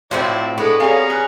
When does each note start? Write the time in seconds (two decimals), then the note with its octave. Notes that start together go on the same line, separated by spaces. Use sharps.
0.11 A2 F3 C4 E4 F#4 C5 D5 F5
0.58 A2 G#3 B3 D4 A4 C#6
0.80 C4 C#4 G4 G#4 C#5 D5 F5 A#5
1.10 B4 F6 F#6